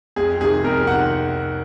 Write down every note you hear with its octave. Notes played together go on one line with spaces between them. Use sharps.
F2 G#4
C3 D#3 G#4
F2 A#4
C3 D#3 F#5